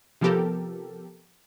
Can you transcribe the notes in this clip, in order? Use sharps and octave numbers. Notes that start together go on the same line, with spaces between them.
C3 F3 B3 G4 A4 A#4